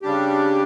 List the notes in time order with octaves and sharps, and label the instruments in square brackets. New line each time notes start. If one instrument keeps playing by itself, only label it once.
[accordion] C#3 G3 D4 G4